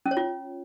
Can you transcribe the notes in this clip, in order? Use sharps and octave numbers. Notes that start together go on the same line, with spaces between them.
C#4
C#5
F4